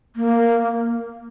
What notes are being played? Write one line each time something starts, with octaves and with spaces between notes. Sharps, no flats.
A#3